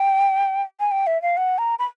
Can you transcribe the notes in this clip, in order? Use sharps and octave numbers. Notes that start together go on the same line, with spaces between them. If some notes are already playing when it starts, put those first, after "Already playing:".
Already playing: G5
G#5
G5
E5
F5
F#5
A#5
B5